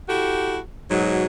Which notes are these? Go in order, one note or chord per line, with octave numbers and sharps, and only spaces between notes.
E4 F#4 G4 A4
G#2 B2 F#3